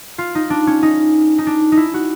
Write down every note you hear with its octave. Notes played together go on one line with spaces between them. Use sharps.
F4
D#4
D4
C#4
D#4
D#4
D4
D#4
E4
F#4